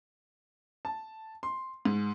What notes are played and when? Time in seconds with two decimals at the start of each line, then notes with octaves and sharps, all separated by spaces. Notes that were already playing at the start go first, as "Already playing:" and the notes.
0.85 A5
1.43 C6
1.85 G#2